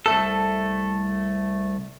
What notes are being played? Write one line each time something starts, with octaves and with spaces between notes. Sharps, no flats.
C2 A3 A4